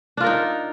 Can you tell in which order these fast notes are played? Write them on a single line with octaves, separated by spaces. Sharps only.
D4 F4 A#4 D#4